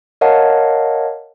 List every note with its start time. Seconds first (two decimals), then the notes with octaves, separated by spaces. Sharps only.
0.21 A#4 C#5 D#5 F5 F#5 A5